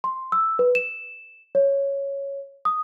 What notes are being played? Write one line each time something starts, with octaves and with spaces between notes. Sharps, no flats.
C6
E6
B4
E7
C#5
D#6